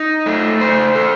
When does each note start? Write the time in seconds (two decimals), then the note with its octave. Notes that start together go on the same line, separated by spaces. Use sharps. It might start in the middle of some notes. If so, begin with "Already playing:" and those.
Already playing: D#4
0.26 A3
0.61 C5
0.95 A4